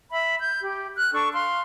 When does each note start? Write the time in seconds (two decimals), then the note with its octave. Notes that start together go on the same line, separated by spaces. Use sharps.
0.11 E5 B5
0.42 G6
0.61 G4
0.97 F6 F#6
1.13 D4 A4 C#6
1.32 F5 C6